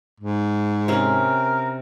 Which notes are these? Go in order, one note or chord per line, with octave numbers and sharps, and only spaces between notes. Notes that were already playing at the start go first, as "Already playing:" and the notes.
G#2
C3 C#4 A#4